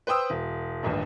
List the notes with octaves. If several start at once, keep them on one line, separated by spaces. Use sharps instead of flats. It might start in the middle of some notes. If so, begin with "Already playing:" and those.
B4 C5 G5 D#6 E6
E1
D#1 A1 G2